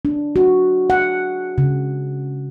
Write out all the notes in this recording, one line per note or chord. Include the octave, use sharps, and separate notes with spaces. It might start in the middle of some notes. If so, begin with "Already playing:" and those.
D4
F#4
F#5
C#3